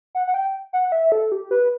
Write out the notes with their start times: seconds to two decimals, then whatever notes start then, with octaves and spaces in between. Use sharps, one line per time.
0.15 F#5
0.27 F#5
0.34 G5
0.73 F#5
0.92 E5
1.12 A4
1.32 G4
1.51 B4